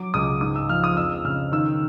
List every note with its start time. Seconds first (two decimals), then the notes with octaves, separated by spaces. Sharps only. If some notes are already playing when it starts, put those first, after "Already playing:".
Already playing: F#3 D6
0.14 C#2 D#6
0.41 G#2 D#6
0.56 E6
0.69 F3 F6
0.84 D#6
0.96 F2 E6
1.24 C#3 F6
1.52 D#3 E6